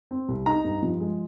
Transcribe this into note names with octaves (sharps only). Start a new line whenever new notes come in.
C4
C2
D#4 A#5
G2
F3
G#3